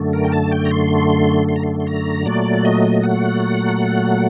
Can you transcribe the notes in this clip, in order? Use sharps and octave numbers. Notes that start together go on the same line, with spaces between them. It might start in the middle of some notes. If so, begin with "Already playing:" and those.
Already playing: F#2 D3 A3
A#4
G5
A5
G5
A#5
C6
C6
A#5
C6
C6
A#5
A#2 F#3 A3 D5
D#5
F#5